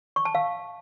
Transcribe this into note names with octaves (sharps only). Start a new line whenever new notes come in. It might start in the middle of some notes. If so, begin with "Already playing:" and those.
C#6
A5
F5